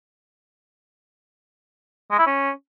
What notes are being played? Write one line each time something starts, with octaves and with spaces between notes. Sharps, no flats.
G#3
E4
C#4